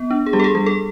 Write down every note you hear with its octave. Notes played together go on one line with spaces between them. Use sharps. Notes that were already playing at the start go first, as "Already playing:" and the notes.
Already playing: B3
D4
G#4
G3 G4
A4
G#4
G3 G#4
A4